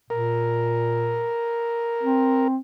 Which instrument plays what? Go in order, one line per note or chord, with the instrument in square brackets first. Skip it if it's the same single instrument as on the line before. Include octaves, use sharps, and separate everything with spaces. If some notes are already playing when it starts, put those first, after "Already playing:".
[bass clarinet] A#2 [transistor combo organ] A#4
[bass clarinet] C4